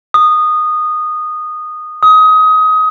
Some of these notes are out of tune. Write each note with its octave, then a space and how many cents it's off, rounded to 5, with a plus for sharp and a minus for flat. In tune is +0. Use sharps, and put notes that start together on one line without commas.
D#6 -15
D#6 +25